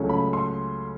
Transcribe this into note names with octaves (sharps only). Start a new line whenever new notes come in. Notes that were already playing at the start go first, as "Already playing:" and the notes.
Already playing: C#2 C#3 F#3 A3 C#4
B5
C6